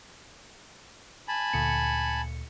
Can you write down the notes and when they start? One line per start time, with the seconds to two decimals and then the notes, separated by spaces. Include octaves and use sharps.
1.28 G#5 A5 B5
1.53 D2 A#2 C#7